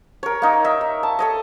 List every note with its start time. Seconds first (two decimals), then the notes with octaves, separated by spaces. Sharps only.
0.23 A#4 C#5
0.42 A#3 D#4
0.64 D#4 E5
0.81 E5
1.03 A5
1.19 A4 C#5 D#5